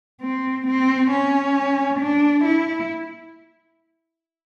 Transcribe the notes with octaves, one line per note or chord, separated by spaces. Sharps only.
C4
C4
C#4
D4
E4